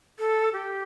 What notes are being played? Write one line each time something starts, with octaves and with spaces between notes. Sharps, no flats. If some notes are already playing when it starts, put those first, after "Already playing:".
A4
G4